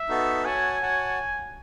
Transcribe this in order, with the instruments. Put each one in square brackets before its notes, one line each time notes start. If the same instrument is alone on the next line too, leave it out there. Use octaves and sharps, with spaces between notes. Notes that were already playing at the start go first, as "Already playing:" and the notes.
Already playing: [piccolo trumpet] E5
[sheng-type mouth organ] B3 D#4 F#4 A4
[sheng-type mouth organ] F#4 C#5 F#5 A5 [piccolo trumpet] G#5
[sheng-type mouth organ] F#4 C#5 F#5 A5